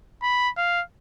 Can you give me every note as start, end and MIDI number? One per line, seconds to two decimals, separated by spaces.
0.23 0.50 83
0.57 0.82 77